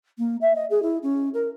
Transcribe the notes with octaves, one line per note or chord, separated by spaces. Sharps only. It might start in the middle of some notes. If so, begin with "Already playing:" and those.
A#3
E5
D#5
G#4
E4
C#4
A#4